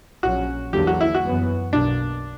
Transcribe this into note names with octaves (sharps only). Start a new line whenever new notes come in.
A#1 A#2 F#3 C#4 F#4
E2 D3 F#3 A#3 G4
F#4
E4
F#4
G1 F#2 E3 B3
B1 B2 A#3 D4